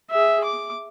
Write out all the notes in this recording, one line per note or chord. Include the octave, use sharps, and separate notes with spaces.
G#4 E5
D6